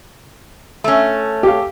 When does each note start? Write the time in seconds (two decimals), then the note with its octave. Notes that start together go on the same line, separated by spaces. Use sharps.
0.84 A3 C#4
1.43 G4 F5